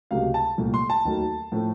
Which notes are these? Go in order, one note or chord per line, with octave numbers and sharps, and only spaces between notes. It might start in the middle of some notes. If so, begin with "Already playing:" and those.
C#2 C3 F#3 A3 F5
A5
C2 A#2 A3
C6
A5
D#2 D#3 F#3 A3
A2 F3 A3